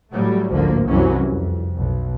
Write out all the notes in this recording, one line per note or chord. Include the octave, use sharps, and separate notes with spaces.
A2 F#3 G3 A3
A1 D2 G#2 D3 F3 A#3
C2 F#2 C3 E3 F#3 C#4
F2
B1